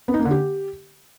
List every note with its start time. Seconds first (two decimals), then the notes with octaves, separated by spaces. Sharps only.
0.08 B3
0.14 D#4
0.20 A#3
0.25 D3
0.31 G4